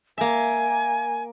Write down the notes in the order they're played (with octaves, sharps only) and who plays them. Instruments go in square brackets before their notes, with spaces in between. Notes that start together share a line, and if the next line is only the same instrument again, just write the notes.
[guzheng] A#3 E5 [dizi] G#5